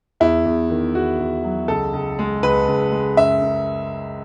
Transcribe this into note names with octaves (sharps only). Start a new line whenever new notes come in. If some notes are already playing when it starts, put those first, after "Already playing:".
E2 E4
E2
D#3
E2 F#4
E2
F#3
C#2 A4
C#2
G#3
C#2 B4
C#2
G#3
F#2 E5
F#2